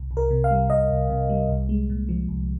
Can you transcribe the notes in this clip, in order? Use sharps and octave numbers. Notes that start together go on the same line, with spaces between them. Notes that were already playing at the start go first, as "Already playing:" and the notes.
Already playing: C2
C2
A#4
C3
F5
G3
C2 D#5
C2
C3
G3
C2
G#3
A#2
F3
C2